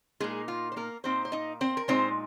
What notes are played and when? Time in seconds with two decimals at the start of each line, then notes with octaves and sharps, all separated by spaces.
0.20 A#2 G#3 A#3 D#4 G#4
0.48 F4
0.72 C5
0.76 A#3 A#4
1.04 A#2 A#3 C4 D#4 C5
1.25 C5
1.32 D#4 D#5
1.61 C4 C5
1.77 A#4
1.88 A#2 G#3 C4 D#4 C5